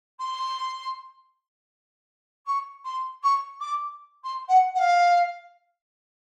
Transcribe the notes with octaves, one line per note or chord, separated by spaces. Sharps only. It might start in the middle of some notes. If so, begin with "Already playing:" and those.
C6
C#6
C6
C#6
D6
C6
F#5
F#5
F5